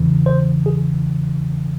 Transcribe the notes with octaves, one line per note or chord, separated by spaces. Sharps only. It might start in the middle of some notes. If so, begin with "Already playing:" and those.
Already playing: E2 C#3 E3
C5
G#4